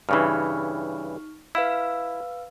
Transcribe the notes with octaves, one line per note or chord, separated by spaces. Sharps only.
G2 C#3 E3 D#4 C#6 F6
E4 B4 F5 E6